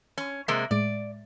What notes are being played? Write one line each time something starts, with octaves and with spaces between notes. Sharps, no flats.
C#4
C3 G#3 A#3
A2 G#3 D5 D7